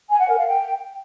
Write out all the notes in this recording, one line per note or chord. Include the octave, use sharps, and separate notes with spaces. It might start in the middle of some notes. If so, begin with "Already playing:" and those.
G#5
F#5
A#4
F5
G5